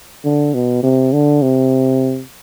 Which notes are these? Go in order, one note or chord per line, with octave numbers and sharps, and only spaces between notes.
D3
B2
C3
D3
C3